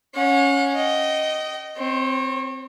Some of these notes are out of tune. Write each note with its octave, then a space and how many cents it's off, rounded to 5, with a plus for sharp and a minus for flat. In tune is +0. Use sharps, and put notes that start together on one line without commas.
C#4 +0 F#5 -40
D#5 +0 G5 -35
C4 +0 C#5 -35